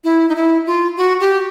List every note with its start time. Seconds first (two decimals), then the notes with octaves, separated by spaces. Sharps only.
0.04 E4
0.29 D#4
0.36 E4
0.66 F4
0.97 F#4
1.20 G4